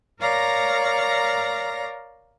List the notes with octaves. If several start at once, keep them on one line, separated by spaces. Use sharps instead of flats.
A#4 C#5 D5 F5 A#5 A#6